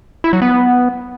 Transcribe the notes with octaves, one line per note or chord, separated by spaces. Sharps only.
E4
F#3
B3